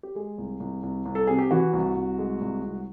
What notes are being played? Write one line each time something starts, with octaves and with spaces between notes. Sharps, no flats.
G4
G#3 G#4
C2
C2
C2
C2
A4
C3 G#4
G4
E3 F#4
C2
C2
G#3
C2
C2